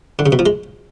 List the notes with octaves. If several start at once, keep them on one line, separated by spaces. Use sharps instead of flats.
D3
C#3
B2
F3
G#3